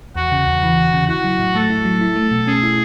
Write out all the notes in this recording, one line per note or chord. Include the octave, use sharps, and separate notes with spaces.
E2 F#4
C#3
E2
E3
E2
C#3
E4 F#4
F#3
A2
A3 A4
E4
F#3
E4
A3
B2
C#4 G#4
E4